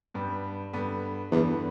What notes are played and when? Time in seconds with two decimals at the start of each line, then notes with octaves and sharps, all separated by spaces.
0.14 G2 G3 B3
0.73 G2 D3 B3
1.32 E2 G2 D3 B3